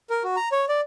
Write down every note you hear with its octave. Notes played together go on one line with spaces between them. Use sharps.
A#4
F#4
A#5
C#5
D5